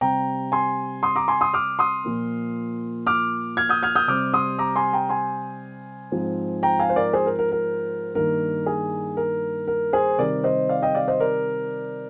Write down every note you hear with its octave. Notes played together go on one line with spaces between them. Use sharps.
C3 G3 C4 G5 A#5
G#5 C6
C6 D#6
A#5 D6
G#5 C6
C6 D#6
D6 F6
C6 D#6
A#2 F3 A#3
D6 F6
F6 G#6
D#6 G6
F6 G#6
D#6 G6
C3 G3 C4 D6 F6
C6 D#6
A#5 D6
G#5 C6
G5 A#5
G#5 C6
G#2 F3 C4
G5 A#5
F5 G#5
C5
A#4 D5
G#4 C5
A#4
A#4
A#4
G2 D#3 A#3 A#4
G#4
A#4
A#4
G#4 C5
C3 D#3 G3 C4 A#4 D5
C5 D#5
D5 F5
D#5 G5
D5 F5
C5 D#5
A#4 D5